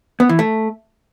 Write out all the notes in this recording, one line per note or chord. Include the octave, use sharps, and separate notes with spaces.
B3
E3
A3